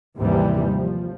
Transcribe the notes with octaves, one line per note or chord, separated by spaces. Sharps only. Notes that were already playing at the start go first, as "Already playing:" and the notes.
D#2 G#2 C3 E3 G3
F3